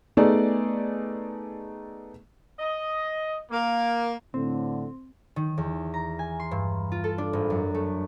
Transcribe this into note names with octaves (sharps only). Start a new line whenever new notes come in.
A3 B3 D#4 G#4 D5
D#5
A#3
A2 D3 C4
D#3
E2
A#5
G#5
C6
G2
F4
A4
D4
G#1
F#2
A3